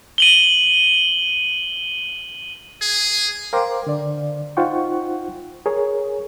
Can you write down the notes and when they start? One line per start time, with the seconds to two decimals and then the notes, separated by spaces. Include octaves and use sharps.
0.18 D#7 F#7 G7
2.82 G#4
3.53 A#4 C5 F5 G5 C6 D6
3.87 D3 D5
4.57 D#4 F4 C5 F#5 G5 C#6
5.66 G#4 A#4 C#5